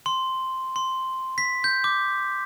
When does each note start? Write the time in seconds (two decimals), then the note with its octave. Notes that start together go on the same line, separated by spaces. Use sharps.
0.06 C6
0.76 C6
1.38 B6
1.64 G6
1.84 D6